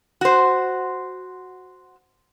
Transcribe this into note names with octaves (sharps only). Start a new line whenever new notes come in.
F#4 C5